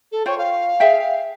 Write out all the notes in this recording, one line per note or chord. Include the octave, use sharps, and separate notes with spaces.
A4
F4 C5 C#5 G5
F5
G#4 E5 G5